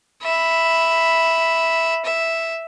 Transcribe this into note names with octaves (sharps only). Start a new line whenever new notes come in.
E5 B5
E5